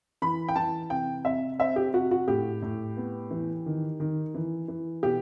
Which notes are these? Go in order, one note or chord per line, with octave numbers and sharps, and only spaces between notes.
E3 B5
G5
E3 A5
C3 G5
C3 E5
C4 E5
G4
C3 F#4
F#4
A2 G4
A2
B3
E3
D#3
D#3
E3
E3
B2 G4